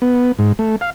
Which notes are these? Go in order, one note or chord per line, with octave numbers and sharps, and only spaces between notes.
B3
G#2
A3
F5